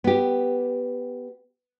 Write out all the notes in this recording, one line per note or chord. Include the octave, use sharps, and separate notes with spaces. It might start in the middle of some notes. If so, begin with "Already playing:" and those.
B3 G4